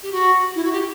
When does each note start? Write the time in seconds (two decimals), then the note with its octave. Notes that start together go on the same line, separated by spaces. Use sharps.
0.02 G4
0.12 F#4
0.55 E4
0.64 F#4
0.72 G4